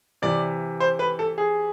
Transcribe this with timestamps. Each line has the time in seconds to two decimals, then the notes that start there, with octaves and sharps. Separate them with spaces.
0.22 C3 E3 D5
0.80 C5
0.99 B4
1.19 A4
1.38 G#4